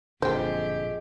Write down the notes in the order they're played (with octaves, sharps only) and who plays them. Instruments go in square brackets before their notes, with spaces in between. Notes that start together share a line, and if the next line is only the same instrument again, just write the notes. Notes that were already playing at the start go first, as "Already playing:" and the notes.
[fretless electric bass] F#1 A#2 D3 [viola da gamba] F2 G4 [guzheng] G#3 [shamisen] C5 G5